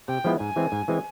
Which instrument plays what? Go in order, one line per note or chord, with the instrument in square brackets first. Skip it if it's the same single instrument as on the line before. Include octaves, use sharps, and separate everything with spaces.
[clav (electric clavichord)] C3 [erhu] G5
[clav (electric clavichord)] F3 G#3 B3 E4
[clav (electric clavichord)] G#2 [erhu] G#5
[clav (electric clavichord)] E3 G#3 C4
G#2
E3 G#3 C4